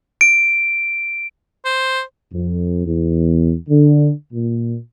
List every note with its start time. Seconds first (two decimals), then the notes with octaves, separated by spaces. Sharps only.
0.21 D7
1.65 C5
2.33 F2
2.86 E2
3.68 D3
4.33 A#2